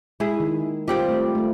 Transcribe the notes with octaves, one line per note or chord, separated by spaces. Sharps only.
G#3 E4 G#4
D#3
G3 C4 F4 G4
A3
A3 F4